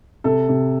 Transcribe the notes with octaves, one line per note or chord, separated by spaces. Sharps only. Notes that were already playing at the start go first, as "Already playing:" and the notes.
C3 A4
C3